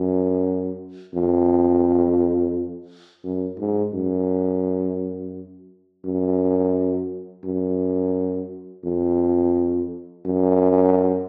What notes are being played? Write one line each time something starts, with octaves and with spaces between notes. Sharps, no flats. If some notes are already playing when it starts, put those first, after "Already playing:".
Already playing: F#2
F2
F#2
G#2
F#2
F#2
F#2
F2
F#2